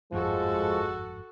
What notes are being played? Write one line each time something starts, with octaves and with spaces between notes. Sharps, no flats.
G1 F2 G#2 F3 G#3 F#4 A4